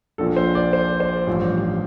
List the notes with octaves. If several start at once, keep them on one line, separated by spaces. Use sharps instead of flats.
A#1 A#2 F3 A4
C5
D5
C5
C5
A1 G2 F3